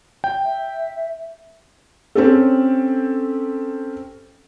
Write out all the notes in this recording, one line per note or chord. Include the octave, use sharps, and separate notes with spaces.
G5
E5
C4 C#4 G4 A4